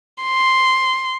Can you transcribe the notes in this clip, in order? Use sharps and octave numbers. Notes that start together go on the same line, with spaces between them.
C6